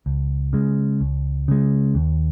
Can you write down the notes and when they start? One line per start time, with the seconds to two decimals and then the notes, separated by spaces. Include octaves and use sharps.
0.06 C#2
0.53 C#3 G#3
1.01 C#2
1.48 C#3 G#3
1.95 D#2